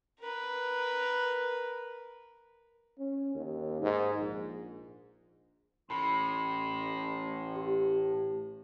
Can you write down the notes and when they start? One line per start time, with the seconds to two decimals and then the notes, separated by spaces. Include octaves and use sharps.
0.19 A#4 B4
2.98 C#4
3.35 D#2
3.82 G#2
4.19 A#1
5.90 A1 A2 B5 C6
7.55 G4